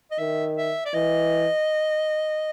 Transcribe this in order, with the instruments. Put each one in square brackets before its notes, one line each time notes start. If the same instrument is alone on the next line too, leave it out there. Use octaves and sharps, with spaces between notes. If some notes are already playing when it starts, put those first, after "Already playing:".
[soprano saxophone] D#5
[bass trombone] D#3 [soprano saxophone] E5
[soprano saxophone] E5
D5
[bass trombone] E3 [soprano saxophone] D#5